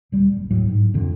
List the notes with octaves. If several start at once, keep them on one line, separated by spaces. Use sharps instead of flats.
D#1 G3
F#1
D#2 A2 F#3
G#2
F2 D3